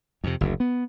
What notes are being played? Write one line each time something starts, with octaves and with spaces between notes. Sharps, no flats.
F2 C3
F#1 D2
B3